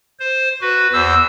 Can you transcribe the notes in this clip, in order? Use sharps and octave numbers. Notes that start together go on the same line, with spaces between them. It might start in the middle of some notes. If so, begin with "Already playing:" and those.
C5
F#4 B4
E2 C5 E6